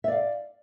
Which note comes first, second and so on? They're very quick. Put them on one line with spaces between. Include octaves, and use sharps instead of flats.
E5 D5 F5